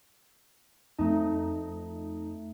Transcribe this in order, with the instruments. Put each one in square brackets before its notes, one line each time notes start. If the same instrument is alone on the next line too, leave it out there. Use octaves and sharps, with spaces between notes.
[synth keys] F2 D#4 [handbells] A3 A5